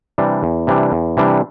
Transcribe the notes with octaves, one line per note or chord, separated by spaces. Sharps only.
C3 E3 G3 D4
E2
C3 E3 G3 D4
E2
C3 E3 G3 D4